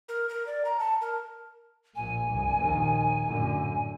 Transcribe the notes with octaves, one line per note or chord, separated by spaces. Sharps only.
A#4
A#4
D5
A#5
A5
A#4
A#1 A#2 G#5
C2 G2
A#1 D#2 D#3
F#2 A2 D3